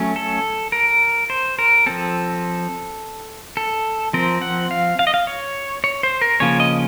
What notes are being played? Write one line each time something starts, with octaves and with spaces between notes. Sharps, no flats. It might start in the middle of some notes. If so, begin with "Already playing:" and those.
Already playing: F#3 A3 C#4
A4
A#4
C5
A#4
F3 C4 A4
A4
F3 C4 A#4
F#5
F5
F5
D#5
F5
C#5
C#5
C5
A#4
C#3 F3 A#3 C#4 C#5
D#5